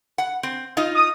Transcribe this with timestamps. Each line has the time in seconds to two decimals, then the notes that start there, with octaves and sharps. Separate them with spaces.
0.18 F#5
0.43 C4
0.77 D#4 F4 D#5
0.95 D#6